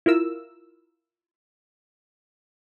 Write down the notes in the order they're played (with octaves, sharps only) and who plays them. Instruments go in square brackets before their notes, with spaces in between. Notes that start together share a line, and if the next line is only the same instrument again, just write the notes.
[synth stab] E4 F4 A#4 E6